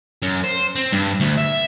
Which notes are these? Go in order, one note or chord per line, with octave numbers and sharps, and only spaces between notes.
F#2
C5
C4
G2
D2
E5